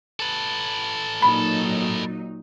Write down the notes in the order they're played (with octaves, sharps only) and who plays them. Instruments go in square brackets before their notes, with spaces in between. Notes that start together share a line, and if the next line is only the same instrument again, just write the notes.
[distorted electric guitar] A4 B4
[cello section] A#2 F#3 D#4 [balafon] B5